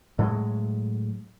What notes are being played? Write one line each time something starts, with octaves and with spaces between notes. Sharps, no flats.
A2 F#3 G#3